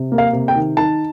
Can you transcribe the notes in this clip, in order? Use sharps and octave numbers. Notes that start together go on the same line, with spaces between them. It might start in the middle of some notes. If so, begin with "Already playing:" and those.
Already playing: C3
A#3
F5
C3
G5
D#3
D#4 A5